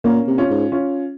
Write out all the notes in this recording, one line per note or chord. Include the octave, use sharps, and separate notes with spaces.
A#2 A#3 C#4
C3
C#4 F4
G#2
C#4 F4